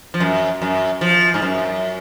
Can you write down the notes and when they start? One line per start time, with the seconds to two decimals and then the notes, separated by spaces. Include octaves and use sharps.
0.14 F3
0.20 F#2
0.62 F#2
1.01 F3
1.34 G#2
1.42 F#2